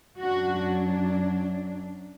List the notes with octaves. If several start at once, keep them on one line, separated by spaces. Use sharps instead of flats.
F#2 F#3 D4 F#4